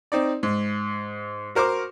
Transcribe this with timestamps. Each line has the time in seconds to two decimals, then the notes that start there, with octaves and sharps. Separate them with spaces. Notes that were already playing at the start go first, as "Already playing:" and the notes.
0.12 C4 D#4 D5
0.43 G#2
1.55 F#4 A#4 C5 C#6 D6 F6